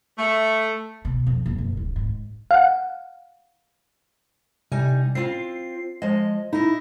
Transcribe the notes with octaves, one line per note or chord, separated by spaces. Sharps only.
A3
B2
F2
D#1
F#1
D1
G#2
F5 F#5
C3 G3 D#4 G#5
C4 F4 C7
F3 G#3 D#5
D#4 E4 D#5